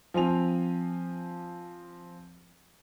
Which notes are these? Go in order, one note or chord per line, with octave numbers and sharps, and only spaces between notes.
F3 C4 G#5 F7